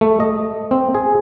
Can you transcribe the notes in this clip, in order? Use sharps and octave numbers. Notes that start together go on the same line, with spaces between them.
A3
D#5
C4
G#4